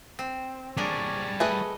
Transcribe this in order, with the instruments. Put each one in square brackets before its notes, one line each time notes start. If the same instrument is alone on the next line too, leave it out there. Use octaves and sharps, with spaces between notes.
[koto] C4
[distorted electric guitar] G3 C#5 [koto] D4 G#4 A#4
[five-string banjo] A3 G#4 B4 [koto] D#5